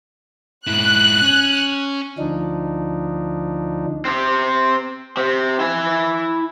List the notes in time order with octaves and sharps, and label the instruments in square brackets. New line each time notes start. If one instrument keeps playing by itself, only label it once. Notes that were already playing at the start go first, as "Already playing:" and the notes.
[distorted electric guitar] G#2 E4 [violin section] F#6
[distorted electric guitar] C#4
[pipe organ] D2 F3 D4 D#4
[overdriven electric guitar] C4 G4
C4 G4
E4 G#5